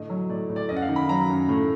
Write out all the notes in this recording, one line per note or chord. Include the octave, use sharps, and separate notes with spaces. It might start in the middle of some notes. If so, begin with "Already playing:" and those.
Already playing: A2 D3 D#5
F#3
A2 D5
A2
D5
F#2 D#5
F#5
F5
D#3
B5
F#3 A#5
F#2
A2